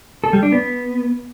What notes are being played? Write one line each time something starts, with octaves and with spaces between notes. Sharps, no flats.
A4
G3
D4
B3